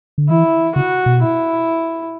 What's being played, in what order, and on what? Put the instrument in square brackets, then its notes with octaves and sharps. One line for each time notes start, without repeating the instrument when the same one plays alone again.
[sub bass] D3
[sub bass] E3 [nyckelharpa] E4
[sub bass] C#3 [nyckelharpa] F#4
[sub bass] B2
[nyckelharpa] E4